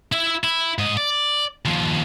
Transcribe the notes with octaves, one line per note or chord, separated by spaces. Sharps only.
E4 E5
E4
G#2 D#5
D5
D#2 F3